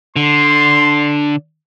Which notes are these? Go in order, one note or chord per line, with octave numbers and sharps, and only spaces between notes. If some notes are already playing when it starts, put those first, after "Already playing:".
D3 C6